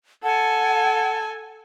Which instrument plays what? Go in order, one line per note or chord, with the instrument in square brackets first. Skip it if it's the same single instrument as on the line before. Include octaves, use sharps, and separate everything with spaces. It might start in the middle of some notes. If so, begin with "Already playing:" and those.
[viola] A4 G#5 [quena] F#5 [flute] A5